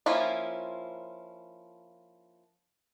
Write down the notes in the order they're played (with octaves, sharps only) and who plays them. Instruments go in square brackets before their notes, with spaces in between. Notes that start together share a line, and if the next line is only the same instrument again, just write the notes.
[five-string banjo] F3 A#3 C#4 E4 F4